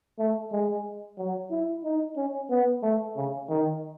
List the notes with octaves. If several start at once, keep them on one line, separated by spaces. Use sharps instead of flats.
A3
G#3
F#3
E4
D#4
C#4
B3
A3
C#3
D#3